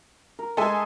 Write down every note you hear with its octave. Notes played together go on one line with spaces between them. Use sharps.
A#4
G#3 G#4 A4 E5 G#5